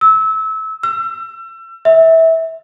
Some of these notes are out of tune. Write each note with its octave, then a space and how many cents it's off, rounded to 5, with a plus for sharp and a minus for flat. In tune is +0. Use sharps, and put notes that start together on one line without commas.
E6 -25
E6 +35
E5 -20